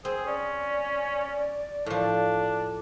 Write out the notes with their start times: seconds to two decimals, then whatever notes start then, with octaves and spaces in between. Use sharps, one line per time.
0.05 C4 G#4 C5
0.27 C#4 D5
1.86 A2 F3 D4